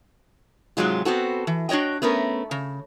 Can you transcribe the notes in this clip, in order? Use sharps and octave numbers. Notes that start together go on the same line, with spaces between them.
G#2 C3 F#3 G#3 F4
B3 C4 F#4 A4
E3
D4 F#4 C#5 D#5 G5
A3 B3 C#4 A#4
C#3